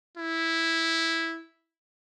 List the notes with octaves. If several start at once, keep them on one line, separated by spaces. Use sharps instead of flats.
E4